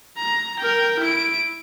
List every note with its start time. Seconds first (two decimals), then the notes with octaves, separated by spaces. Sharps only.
0.18 A#5
0.59 A#4 G5
1.00 E4 D7